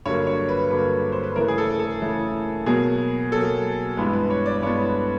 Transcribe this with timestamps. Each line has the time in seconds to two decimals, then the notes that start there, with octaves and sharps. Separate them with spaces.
0.06 G2 D3 F#3 A#3 C#5
0.27 C#5
0.49 B4
0.71 G2 D3 F#3 A#3 B4
1.12 C5
1.24 B4
1.36 C#3 E3 A3 A#4
1.48 G#4
1.58 A4
1.79 A4
2.02 C#3 E3 A3
2.66 B2 F#3 A#3 G#4
3.31 B2 F#3 A#3 A4
3.97 G2 E3 G#3 B3
4.13 B4
4.30 C#5
4.46 D5
4.62 G2 E3 G#3 B3 C#5